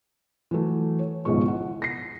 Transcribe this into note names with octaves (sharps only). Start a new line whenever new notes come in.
E3 F#3 A3
C#5
G#1 C#2 B2 F3 G#3 C#6
E4 F#5
A#6 C7